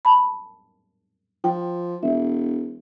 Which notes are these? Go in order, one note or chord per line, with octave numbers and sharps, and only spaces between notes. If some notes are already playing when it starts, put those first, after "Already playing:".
A5 B5
F3 G5
E1 E5